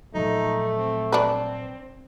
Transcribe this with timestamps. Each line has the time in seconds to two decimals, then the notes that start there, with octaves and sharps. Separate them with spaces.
0.15 A#2 F3 F#3 A3 D#4
0.76 C4
1.12 D4 B4